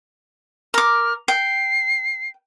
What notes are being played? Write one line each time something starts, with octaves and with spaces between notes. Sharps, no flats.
A#4 D6 F6
G5 C7